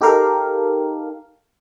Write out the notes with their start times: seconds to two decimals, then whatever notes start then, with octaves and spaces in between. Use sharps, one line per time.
0.01 D#4 G4 A4 A#4 F5